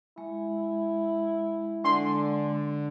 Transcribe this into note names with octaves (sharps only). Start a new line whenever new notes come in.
G#3 E4
D3 G#3 C6